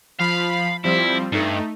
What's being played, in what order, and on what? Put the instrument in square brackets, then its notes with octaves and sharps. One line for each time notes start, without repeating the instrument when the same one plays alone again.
[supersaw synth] F3 B5 [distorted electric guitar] F5
[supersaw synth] F3 G3 C4 [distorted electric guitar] E4
[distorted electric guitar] G2 [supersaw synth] A3 D#4